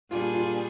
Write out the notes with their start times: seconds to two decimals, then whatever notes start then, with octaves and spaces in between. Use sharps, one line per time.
0.11 A#2 G3 D4 F4 G#4
0.34 F4